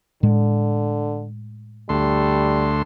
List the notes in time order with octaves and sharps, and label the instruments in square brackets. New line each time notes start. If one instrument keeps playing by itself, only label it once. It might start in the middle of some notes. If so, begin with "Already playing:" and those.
[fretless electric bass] A2 G#3 [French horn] D3
[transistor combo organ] D2 A3 C6 [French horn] G3